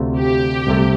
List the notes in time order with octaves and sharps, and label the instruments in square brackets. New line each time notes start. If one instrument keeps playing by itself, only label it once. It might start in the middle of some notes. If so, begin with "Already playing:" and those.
Already playing: [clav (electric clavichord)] D2 C3 A3 F4
[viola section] G4
[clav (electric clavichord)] C2 C3 A3